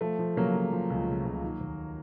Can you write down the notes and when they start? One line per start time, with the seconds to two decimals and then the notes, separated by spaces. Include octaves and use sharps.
0.01 F3 A3
0.19 F3
0.36 C#3 F#3 A#3
0.54 F3
0.73 F3
0.90 C#2
1.08 C#3
1.25 C#2
1.43 D#3
1.61 D#2